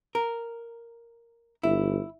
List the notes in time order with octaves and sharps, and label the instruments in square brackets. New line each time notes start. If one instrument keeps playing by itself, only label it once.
[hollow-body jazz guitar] A#4
[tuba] G1 [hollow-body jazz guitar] E4